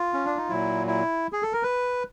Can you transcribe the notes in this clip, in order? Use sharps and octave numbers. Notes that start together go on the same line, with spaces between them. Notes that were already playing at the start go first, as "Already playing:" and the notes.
Already playing: F4
C#4
D4
D#4
A#2 F#3 E4
E4
G#4
A4
A#4
B4